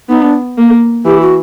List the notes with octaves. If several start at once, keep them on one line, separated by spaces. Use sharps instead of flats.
B3 D#4
D4
A#3
E3 G4
F#4